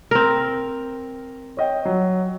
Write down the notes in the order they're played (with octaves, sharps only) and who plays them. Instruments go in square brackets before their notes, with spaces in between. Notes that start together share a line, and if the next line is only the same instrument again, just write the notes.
[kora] C4 A#4
[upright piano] C#5 D#5 G5
F#3 C#5